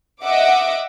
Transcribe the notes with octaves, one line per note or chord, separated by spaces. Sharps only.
D#5 E5 F#5 D6